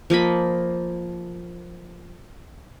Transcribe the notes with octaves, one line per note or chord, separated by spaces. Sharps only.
F3 A#3 D#5 B5